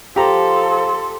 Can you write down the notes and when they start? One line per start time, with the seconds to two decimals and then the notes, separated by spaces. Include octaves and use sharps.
0.16 F3 G4 A4 A#5 C6